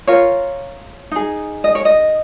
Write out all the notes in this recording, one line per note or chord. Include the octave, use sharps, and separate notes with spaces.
F4 A#4 C#5
D#4 G#4
D#5
C#5
D#5